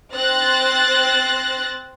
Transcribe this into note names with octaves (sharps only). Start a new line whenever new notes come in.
C4 C5 F#6 A6 A#6